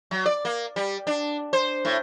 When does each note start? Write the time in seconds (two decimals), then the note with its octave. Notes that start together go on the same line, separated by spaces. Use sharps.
0.11 F#3
0.26 D5
0.45 A#3
0.76 G3
1.07 D4
1.53 C5
1.85 A2